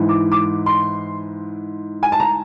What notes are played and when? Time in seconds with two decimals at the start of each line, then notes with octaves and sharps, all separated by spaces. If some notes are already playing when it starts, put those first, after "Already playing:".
Already playing: G#2 E3
0.09 D6
0.32 D6
0.66 C6
2.03 G#5
2.12 A5
2.20 A#5